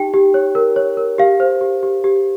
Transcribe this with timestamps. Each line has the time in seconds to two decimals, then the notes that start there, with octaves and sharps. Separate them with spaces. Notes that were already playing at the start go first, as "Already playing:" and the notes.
Already playing: D#4 G4 G5
0.14 G4
0.34 C#5
0.55 A#4
0.76 C#5
0.97 A#4
1.18 G4 F5
1.40 C5
1.61 G4
1.83 G4
2.04 G4